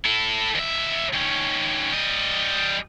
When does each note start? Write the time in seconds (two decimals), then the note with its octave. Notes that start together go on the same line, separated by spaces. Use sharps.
0.05 E4 A4
0.55 D#2 E5
1.13 D#3 C#4
1.92 G3 D#5